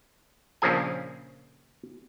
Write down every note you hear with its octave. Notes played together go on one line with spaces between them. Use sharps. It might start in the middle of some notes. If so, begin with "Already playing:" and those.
A#1 C#3 F3 G#4 G#5